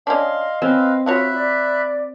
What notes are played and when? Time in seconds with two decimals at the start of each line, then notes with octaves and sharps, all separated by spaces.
0.07 C#4 D4 D#5 F5 C6
0.62 C4 C#4 B4 F5
1.06 C#4 F4 F#4 C#5 E5 B5 F#6
1.34 D5